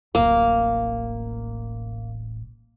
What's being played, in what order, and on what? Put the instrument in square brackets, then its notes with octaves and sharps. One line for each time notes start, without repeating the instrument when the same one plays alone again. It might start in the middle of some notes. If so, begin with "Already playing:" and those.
[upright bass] D1 A1 [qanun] A#3